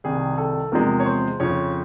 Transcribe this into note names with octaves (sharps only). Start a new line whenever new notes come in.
C2 C3 D#3 G3 G#4
A4
E2 C3 F3 G#3 A#4
C#5
C5
F2 C#3 F3 C#5